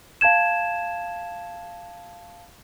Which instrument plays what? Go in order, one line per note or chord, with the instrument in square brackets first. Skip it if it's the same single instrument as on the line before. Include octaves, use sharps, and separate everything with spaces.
[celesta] F5 A5 G#6 E7